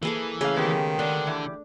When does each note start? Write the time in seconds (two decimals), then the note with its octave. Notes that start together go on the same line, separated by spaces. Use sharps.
0.03 E3 A#3 G#4 A4
0.41 C#3 A3 G#4 C#5 F5
0.56 D#3 G#3 B3 G4
0.99 D3 D4
1.27 E3 G4